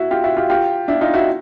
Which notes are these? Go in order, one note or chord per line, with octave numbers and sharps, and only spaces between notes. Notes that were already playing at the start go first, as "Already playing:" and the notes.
Already playing: E4 F#4
F4 G4
E4 F#4
F4 G4
F4 G4
D4 E4
D#4 F4
E4 F#4